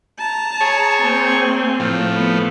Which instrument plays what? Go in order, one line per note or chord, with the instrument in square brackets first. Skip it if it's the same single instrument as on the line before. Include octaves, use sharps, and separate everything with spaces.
[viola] A5 A#5
[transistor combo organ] G#4 C#5
[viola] A#3 C4
[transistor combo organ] A2 F3
[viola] B3